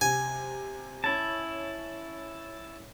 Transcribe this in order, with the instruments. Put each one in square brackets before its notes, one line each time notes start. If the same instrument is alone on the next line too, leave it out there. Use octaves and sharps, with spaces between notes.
[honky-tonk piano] C3 [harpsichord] G#5
[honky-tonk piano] C#4 G#6 [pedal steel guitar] E4 A5